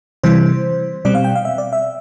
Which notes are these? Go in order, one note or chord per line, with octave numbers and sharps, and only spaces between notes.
C3 E3 G3 C5
B2 G3 C4 D5
F5
G5
F5
E5
D5
E5